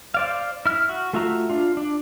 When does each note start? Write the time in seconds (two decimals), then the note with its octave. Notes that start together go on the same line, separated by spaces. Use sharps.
0.14 C5 D5 F5
0.66 E4 F6
0.89 F#4
1.13 A3 F4 F#4 E5 A#5
1.50 D4 F4
1.77 D4